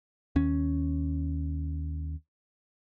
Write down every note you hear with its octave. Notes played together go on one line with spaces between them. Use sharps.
D#2 C#4